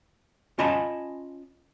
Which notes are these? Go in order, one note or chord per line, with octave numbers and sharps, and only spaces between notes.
C#4 F4 D#5 G#5 A5 B5